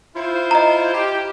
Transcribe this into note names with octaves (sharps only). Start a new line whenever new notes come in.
E4 F4 C5
D#5 A#5
G4